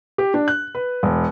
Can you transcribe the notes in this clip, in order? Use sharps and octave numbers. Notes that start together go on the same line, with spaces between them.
G4
D4
F#6
B4
E1